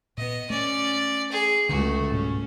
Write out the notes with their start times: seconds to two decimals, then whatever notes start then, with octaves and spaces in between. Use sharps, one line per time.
0.17 A#2 B3 D#5
0.50 A3 C#4 D5
1.31 G#4
1.69 C#2 D3 A3 F#4
2.12 G#2 B2 G3 C#4